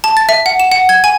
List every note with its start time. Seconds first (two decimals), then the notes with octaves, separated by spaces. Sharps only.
0.04 A5
0.17 A6
0.29 E5
0.46 F#5
0.60 E7
0.71 F#5
0.89 G#6
1.04 G#5